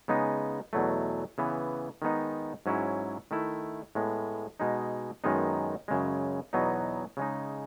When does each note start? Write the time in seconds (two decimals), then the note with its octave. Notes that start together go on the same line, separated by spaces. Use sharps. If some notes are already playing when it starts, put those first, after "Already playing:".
0.08 C#3 G#3 B3 D#4
0.73 E2 B2 F#3 A3
1.38 C#3 E3 B3
2.02 D#3 G#3 B3 D#4
2.66 G#2 F#3 C#4 E4
3.31 D#3 A3 E4
3.95 A2 G#3 B3
4.60 B2 G#3 D#4
5.24 F#2 D#3 G#3 B3 D#4
5.88 F#2 C#3 G#3
6.53 E2 B2 F#3 B3 D#4
7.17 C#3 G#3 D#4